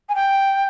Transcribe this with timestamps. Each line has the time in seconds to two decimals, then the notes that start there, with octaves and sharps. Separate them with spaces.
0.09 G#5
0.15 G5